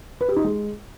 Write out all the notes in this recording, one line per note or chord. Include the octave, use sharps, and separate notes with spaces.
B4
G4
D#4
G#3